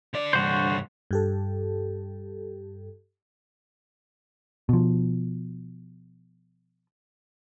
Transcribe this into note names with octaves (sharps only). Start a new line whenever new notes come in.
D3 D5
C2 G2 D3 F#4 C5
G2 G4 A4
B2 F3